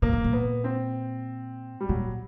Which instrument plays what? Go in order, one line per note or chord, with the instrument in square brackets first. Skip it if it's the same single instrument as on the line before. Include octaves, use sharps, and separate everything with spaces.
[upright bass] A#2 [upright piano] A#3
[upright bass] A2
A#2
[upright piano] B3
C4
G3
[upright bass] A#2 [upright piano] F#3